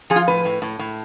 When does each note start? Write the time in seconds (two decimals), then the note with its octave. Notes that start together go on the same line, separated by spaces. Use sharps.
0.10 F3 G#4
0.16 F4
0.28 A2 B4
0.45 A2
0.62 A2
0.79 A2